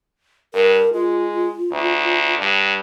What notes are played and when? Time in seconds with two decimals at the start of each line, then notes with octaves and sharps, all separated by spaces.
0.54 G2 A#4
0.93 G#3 F4
1.72 D2
2.39 G2